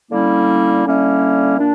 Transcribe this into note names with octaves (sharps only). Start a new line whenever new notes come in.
D3 G3 A#3 C#4 E4
D3 G3 A#3 C#4 E4
A#2 A#3 D4